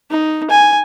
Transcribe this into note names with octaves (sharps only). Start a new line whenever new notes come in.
D#4
G#5